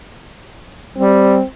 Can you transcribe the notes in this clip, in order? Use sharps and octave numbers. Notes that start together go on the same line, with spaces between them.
G3 C4